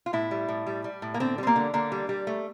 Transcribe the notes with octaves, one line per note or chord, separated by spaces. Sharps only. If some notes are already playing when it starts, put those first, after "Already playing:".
F4
A2 E4
G3
A2
G3
G3
A2
A#3
D3 C4
G3 C4
A#3
D3
D3 A#3
G3
G3
A3